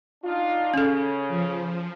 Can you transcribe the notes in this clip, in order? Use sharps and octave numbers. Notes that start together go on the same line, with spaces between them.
D4 D#4 F4
C#3 C#4 A4
F3